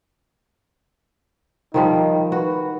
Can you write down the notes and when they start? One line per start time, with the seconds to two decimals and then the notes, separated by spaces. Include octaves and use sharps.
1.74 D#3 F3 G3 D#4
2.32 F#4 B4